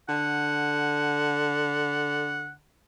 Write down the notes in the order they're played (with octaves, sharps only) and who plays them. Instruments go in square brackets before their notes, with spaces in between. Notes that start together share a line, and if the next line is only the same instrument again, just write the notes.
[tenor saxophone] D3 [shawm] F#5